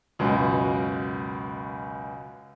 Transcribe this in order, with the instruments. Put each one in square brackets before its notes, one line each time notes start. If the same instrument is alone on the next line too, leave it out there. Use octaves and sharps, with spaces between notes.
[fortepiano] C#2 F#2 B2